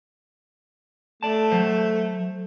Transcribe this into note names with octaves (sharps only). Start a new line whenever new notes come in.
A3 D5 A5
F#3 C5